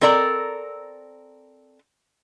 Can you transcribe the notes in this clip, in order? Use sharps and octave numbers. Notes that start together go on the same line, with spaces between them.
C4 A4 A#4 D5 A#5